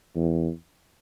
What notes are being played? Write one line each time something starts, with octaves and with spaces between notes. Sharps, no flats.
E2